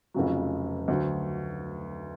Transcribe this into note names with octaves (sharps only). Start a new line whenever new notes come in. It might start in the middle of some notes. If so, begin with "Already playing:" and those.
F1 F2 C#3 F#3
D2 D3 F#3